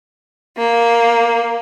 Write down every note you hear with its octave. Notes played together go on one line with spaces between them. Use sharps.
A#3